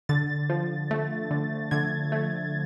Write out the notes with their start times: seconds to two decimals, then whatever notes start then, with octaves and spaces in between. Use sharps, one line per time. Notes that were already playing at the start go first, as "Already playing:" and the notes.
0.09 D3 A6
0.50 F3
0.91 A3
1.31 D3
1.71 D3 G#6
2.12 A3